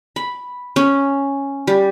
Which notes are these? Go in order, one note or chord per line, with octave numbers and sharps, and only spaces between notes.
B5
C#4
G3